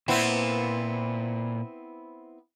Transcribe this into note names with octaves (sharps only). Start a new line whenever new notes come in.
A#2 B3 C4 E4